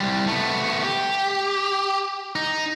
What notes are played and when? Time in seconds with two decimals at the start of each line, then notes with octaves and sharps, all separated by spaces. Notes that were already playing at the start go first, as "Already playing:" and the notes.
0.01 C2 G3
0.27 A3 B3
0.83 G4
2.36 D#4